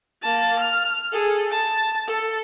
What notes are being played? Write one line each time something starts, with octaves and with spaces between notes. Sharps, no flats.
A#3 A5
F6
G#4 A4
A5
A4